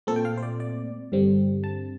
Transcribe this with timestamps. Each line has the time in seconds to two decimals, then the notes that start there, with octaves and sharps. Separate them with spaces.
0.07 A#2 A3 C4 A4
0.16 G5
0.25 F5
0.37 C5
0.43 D5
0.60 D5
1.12 G2 D3 G3 C4
1.64 A5